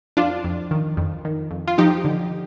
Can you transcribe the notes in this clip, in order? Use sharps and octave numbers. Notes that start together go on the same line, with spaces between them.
F2 D4 F4
F2
D#3
F2
D#3
F2
F4
F3 D#4 G4
D3